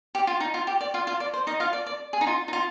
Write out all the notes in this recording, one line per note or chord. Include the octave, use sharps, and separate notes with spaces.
G4
F4
D#4
F4
G4
D5
F4 F5
F4 F5
D5
C5
D#4 D#5
F4 F5
D5
D5
G#4
D#4
F4
D#4
F4